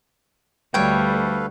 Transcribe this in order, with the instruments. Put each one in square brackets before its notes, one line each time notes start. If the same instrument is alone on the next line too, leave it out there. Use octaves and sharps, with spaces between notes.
[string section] D2 [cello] G3 [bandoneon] A4 B4 F5 [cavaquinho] C#5 G5